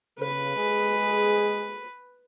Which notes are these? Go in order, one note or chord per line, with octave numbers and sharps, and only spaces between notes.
C#3 B4
G#3 G#4